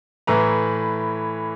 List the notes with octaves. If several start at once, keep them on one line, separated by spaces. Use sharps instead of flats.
A2 E3 B4 A#5